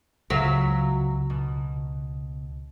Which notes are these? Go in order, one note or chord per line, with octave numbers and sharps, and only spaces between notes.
C#2 F#3 E5 F5
B2